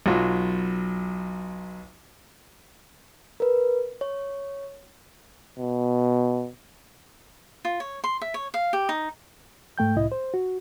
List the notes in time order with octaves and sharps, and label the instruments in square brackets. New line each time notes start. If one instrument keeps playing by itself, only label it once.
[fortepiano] B1 F#3 F4
[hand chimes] A#4 B4
C#5
[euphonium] B2
[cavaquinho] F4
C#5
C6
E5
C#5
F5
G4
D#4
[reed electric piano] G#2 A3 G5 G6
C2 A2 E4 D#5
C5
F#4